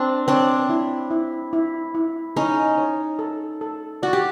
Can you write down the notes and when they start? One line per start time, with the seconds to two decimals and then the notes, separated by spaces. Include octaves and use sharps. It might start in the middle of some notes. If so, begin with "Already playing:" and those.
Already playing: C4 D4
0.28 C4 D4 C#5
0.69 E4
1.11 E4
1.53 E4
1.95 E4
2.36 C#4 D#4 G#4
2.78 C#5
3.19 A4
3.61 A4
4.03 F#4 D5
4.13 G4